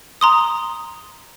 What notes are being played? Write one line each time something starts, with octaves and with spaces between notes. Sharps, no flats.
A#5 C6 D#6